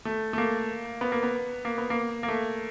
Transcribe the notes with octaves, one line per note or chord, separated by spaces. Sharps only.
A3
A3
A#3
B3
A#3
B3
A#3
B3
A#3
A#3
A3